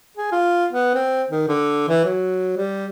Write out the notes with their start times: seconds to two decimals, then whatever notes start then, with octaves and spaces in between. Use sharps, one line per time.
0.17 G#4
0.32 F4
0.73 B3
0.95 C4
1.31 D#3
1.48 D3
1.89 E3
2.05 F#3
2.57 G3